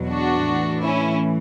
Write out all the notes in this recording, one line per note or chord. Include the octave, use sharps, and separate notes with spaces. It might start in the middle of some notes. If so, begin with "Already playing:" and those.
Already playing: E2 B2 F#3
D4 F#4
A2 E3
C#4 E4